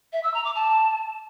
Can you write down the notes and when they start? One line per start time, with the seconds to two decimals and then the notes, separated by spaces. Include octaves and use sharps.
0.13 E5
0.23 E6
0.34 A#5
0.44 D6
0.55 A5